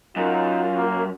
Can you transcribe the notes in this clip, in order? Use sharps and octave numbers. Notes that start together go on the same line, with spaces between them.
F#2 D#4 F4
A#3